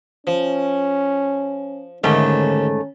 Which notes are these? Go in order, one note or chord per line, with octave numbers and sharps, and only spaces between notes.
F3 C#4
D#2 G#2 D3 A3 C#4